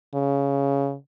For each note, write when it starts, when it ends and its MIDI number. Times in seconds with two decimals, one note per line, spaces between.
0.14 0.95 49